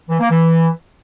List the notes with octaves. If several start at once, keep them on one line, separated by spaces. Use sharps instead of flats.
E3
A#3
E3